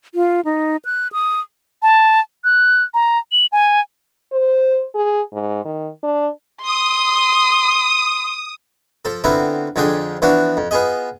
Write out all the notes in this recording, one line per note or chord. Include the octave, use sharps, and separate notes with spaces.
F4
D#4
F#6
D#6
A5
F#6
A#5
F#7
G#5
C5
G#4
G#2
D#3
D4
C6 D#6
F3 A4
D3 B3 C4 E4 F4 A#5
F2 D3 F3 D4 G#4 G5
E3 F3 B3 D4 F#4
F2
B3 F4 G#4 D#5